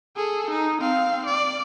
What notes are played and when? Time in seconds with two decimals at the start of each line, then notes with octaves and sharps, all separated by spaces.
0.16 G#4 A4
0.50 D#4
0.81 C4 F5
1.26 D5